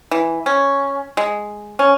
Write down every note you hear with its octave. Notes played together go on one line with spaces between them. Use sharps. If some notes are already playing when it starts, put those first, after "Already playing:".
E3
C#4
G#3
C#4